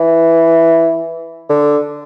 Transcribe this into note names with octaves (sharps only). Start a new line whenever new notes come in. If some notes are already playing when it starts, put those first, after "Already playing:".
Already playing: E3
D3